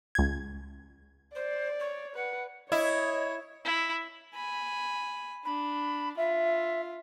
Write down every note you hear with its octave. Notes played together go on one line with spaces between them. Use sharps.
C#2 G#6
C5 D5
C#5
B4 F#5
E4 C#5 D#5
E4
G#5 B5
D4 B5
F4 E5